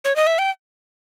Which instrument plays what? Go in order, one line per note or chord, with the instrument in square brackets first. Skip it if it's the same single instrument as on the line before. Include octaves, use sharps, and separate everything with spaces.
[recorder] C#5
D#5
E5
G5